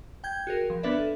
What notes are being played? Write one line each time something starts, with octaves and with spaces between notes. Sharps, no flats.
G5 G6 G#6
F#4 G#4 A#4
F3
B3 D4 B4 D5 E5
A4